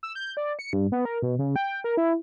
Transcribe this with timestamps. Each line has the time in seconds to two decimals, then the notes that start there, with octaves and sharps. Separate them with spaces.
0.03 E6
0.15 G6
0.37 D5
0.59 C#7
0.73 G2
0.92 B3
1.05 A#4
1.22 B2
1.39 C#3
1.56 G5
1.84 A#4
1.97 E4